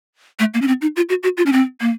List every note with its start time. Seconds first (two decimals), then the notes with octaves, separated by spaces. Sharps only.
0.39 A3
0.54 A#3
0.62 C#4
0.68 C4
0.82 D#4
0.96 F4
1.09 F#4
1.23 F#4
1.37 F4
1.46 C#4
1.52 C4
1.81 A#3